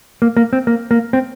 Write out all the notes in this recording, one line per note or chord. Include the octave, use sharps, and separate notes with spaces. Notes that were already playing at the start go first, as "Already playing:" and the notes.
A#3
A#3
C4
A#3
A#3
C4